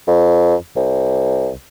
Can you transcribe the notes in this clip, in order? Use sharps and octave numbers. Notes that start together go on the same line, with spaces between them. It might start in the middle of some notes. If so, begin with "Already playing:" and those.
F2
C2